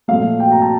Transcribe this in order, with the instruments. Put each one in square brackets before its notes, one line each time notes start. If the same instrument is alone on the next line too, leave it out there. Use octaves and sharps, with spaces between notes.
[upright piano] A#2 F3 A3 F5
G5
A#5
A5